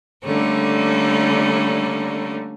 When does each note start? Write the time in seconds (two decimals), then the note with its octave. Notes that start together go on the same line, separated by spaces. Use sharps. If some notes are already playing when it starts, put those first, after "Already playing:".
0.22 D3 G3 A3 A#3 C#4